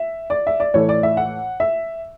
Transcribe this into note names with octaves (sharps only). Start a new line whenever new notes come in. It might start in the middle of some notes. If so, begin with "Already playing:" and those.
Already playing: E5
D5
E5
D5
A2 E3 A3 C#5
D5
E5
F#5
E5